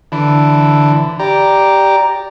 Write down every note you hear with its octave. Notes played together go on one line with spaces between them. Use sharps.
D3 E3
G4 D5 A#5